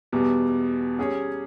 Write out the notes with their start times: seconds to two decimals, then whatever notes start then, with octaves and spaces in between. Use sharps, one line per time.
0.12 E2 B2 G3
0.98 G3 C#4 G#4 C#5